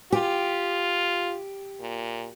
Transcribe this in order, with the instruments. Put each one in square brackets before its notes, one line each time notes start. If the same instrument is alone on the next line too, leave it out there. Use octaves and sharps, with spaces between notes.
[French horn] F4 [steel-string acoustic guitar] G4
[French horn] A#2